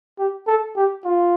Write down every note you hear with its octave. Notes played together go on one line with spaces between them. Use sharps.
G4
A4
G4
F4